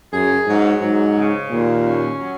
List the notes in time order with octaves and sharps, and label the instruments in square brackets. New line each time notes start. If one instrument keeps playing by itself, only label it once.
[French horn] F#2 [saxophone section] G#4
[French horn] G#2 [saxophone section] F#3
[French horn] G#2 [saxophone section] F#3
[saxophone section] C#3
[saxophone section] D#2 [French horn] A#2
[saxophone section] C#4
F#3